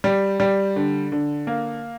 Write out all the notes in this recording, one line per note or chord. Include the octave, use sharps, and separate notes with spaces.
G3
G3
D3
D3
A#3